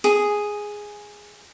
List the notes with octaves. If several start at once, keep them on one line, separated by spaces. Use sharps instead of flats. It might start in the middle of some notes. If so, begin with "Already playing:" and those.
G#4